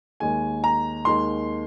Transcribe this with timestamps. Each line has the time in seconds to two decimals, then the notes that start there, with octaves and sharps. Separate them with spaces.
0.20 D#2 D#3 G#3 G#5
0.64 A#5
1.05 D#2 D#3 G#3 C6